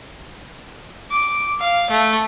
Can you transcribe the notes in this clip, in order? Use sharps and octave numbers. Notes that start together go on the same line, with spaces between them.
D6
F5
A3